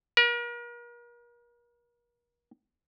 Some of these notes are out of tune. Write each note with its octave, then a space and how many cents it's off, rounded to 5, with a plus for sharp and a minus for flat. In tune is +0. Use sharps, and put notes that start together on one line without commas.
A#4 +40